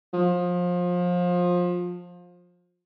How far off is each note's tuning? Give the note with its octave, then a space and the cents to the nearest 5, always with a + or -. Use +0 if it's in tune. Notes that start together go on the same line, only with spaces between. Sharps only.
F3 +25